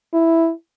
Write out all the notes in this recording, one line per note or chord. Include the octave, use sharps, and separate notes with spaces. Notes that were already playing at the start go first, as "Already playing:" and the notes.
E4